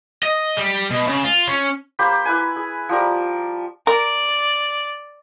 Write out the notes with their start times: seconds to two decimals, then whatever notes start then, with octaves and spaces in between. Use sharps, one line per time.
0.23 D#5
0.57 G3
0.90 B2
1.08 C#3
1.24 F4
1.48 C#4
1.99 A#3 G4 C5 B5
2.25 E4 B4 G#5
2.56 G#4
2.89 F3 G3 A#4
3.87 A#4 D5